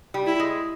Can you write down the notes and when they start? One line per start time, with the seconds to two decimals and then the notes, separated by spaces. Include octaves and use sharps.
0.14 G3
0.26 E4
0.40 G#3